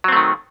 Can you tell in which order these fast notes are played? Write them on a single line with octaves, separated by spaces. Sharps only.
F#3 C4 A3 D#3